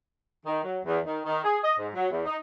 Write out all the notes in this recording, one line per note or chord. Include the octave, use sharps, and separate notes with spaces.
D#3
F#3
E2
D#3
D#3
G#4
D#5
G#2
F#3
E2
D#4